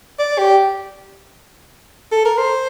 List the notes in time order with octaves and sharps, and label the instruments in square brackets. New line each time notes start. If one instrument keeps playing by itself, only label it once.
[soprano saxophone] D5
G4
A4
A#4
C5